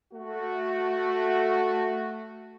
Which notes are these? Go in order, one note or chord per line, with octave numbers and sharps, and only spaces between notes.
A3 F#4